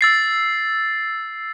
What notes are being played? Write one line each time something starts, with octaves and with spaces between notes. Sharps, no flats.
E6 A6 C7